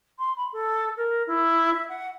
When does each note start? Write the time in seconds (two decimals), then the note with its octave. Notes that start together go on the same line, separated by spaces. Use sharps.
0.19 C6
0.36 B5
0.52 A4
0.97 A#4
1.27 E4
1.73 E5
1.89 F#5